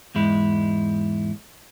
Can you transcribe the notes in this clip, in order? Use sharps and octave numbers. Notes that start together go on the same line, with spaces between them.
E2 G#2 G#3 E4